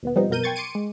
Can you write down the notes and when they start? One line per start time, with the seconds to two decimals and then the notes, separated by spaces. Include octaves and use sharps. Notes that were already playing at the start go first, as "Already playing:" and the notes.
0.03 D#2 B2 B3
0.16 F3 G3 B3 C4 D#4
0.30 F#2 B2 B3 A#4 G6 D#7
0.44 G5 C6 C#6 G#6 A6
0.56 C6 D6 C#7 D#7
0.75 G#3